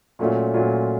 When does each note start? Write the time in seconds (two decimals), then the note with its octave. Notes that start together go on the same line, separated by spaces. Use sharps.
0.19 A#2 F#3 A3 C#4 F4
0.54 A#2 F#3 A3 C#4 F4